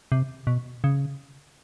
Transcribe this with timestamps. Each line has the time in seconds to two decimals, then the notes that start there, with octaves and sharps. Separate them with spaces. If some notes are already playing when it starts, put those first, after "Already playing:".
0.12 C3
0.47 B2
0.84 C#3